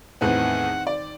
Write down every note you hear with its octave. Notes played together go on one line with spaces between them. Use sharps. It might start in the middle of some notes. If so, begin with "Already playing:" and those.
E2 A2 D#3 B3 C4 C5 F#5
D5